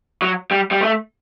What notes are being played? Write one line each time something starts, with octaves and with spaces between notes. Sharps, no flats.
F#3
G3
G3
A3